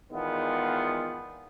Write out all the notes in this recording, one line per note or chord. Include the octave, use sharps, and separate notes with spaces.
E2 D#3 G#3 B3 F4